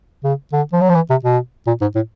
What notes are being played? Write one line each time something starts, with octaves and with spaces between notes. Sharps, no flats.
C#3
D3
F3
F#3
F3
E3
C3
B2
A#2
G#2
A2